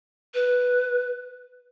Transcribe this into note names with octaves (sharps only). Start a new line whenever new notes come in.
B4